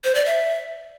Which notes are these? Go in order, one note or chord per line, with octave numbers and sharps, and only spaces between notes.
C5
D5
E5